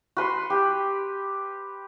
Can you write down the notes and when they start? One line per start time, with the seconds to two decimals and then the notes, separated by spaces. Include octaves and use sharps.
0.17 F#4 B4 C6
0.50 G4